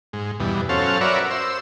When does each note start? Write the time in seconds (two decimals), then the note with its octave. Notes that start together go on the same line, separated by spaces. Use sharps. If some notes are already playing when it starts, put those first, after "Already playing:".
0.13 G#2
0.40 E2 G2 B2
0.69 F#3 C#4 A4 C5 F5
1.01 F#4 A#4 B4 C#5 D5 E5
1.31 C5 E6